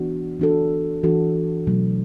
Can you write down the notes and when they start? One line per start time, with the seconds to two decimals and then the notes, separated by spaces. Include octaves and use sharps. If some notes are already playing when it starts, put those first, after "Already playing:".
Already playing: E3 B3 D4 F#4
0.40 E3 D4 F#4 A4
1.03 E3 D4 F#4 A4
1.67 B2 F#3 A3